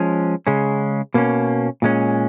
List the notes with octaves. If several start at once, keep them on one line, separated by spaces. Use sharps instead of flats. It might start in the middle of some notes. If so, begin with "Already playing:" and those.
Already playing: F3 G#3 C#4
C#3 G#3 C#4
B2 A#3 C#4
A#2 G#3 C#4